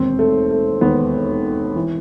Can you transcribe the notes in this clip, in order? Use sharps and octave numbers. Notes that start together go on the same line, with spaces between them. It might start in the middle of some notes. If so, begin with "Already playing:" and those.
Already playing: E1 D#2 D#3 C4
A3
A3
E1 D#2 D#3 B3
E3